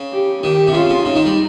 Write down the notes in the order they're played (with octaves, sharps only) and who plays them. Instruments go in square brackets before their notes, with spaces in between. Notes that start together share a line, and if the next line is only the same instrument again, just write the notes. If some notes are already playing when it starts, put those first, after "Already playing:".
Already playing: [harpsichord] C#3
[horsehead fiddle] G4
[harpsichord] D#3 [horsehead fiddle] G4
[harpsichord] C3
[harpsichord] C#3 [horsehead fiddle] F4
[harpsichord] C#3
[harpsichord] C#3 [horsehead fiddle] D#4
[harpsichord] D#3
G3